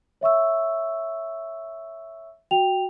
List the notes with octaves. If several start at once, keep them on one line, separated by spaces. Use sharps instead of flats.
C#5 E5 C#6 E6
F#4 G5 F7